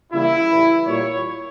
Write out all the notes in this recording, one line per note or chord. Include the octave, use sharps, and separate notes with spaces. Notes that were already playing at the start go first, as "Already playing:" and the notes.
C#3 E3 G3 A#3 E4
A2 E3 G3
A#2 G3 A#3 C#5